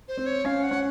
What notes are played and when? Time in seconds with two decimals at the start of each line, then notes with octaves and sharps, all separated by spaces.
0.08 C5
0.17 C4
0.26 C#5
0.45 C#4 F5
0.63 F#5
0.71 C#4